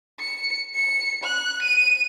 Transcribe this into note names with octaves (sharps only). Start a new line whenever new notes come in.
C#7
C#7
F#6
D#7